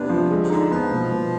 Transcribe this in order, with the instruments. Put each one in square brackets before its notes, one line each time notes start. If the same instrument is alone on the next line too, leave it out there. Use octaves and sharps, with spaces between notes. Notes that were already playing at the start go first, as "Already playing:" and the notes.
Already playing: [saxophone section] C3 [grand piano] B3 D4
[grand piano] F3
[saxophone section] D3 [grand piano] G#3
[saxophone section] C3
[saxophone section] D3 [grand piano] D#4
[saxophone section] F3 [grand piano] B3
[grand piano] B2
B2